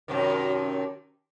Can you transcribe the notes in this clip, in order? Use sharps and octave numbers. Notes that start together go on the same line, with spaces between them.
F#2 C3 D#3